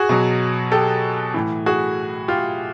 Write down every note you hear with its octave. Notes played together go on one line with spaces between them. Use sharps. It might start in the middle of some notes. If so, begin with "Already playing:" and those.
Already playing: F#4 G#4
B2 F#3
G4 A4
A2 E3
F#4 G#4
F4 G4